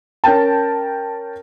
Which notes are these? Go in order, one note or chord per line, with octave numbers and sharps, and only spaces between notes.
C#4 A#4 G5 A5